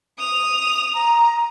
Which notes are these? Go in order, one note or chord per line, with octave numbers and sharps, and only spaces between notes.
D#6 F7
A#5